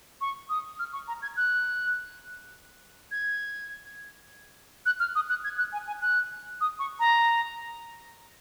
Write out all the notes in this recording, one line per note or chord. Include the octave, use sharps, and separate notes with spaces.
C#6
D#6
F6
C#6
A#5
G#6
F#6
G#6
F#6
F6
D#6
F#6
G#6
F#6
G#5
G#5
F#6
D#6
C#6
A#5